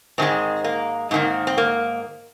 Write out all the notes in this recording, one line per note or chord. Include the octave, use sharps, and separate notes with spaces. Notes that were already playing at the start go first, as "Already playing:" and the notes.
G#2 D#3 G#3 C4
A#3
G#2 D#3 A#3 C4
C4
A#3